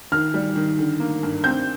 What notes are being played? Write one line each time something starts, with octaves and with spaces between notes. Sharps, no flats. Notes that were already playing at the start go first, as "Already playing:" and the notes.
D#3 F6
G3
D#3
D3
A#3
G2
C4 G6